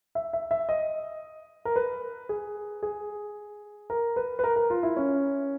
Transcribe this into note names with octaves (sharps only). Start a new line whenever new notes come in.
E5
E5
E5
D#5
A#4
B4
G#4
G#4
A#4
B4
B4
A#4
A#4
F4
E4
C#4